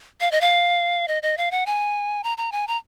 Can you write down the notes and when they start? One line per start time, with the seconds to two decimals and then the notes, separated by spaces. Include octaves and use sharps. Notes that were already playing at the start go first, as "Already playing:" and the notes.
0.21 F5
0.32 D#5
0.41 F5
1.08 D#5
1.23 D#5
1.37 F5
1.51 F#5
1.66 G#5
2.24 A#5
2.38 A#5
2.52 G#5
2.68 A#5